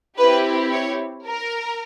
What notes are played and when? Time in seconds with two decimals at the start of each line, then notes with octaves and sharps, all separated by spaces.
0.17 C4 E4 G4 B4
0.71 C#5
1.26 A#4